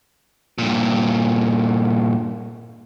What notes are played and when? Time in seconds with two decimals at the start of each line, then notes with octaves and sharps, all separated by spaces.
0.58 G2 A#2